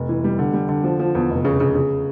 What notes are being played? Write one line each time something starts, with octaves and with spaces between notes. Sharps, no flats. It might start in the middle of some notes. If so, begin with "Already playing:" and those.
Already playing: F1
E3
G3
D3
G3
D3
F3
F3
E2
F1
C#3
C#3
C#3